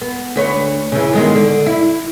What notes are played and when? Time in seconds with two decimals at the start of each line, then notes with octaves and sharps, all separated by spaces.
0.01 B3
0.36 D2 B4 C#5
0.92 C#3 E3
1.13 D#3 G#3 B3
1.36 D3
1.66 E4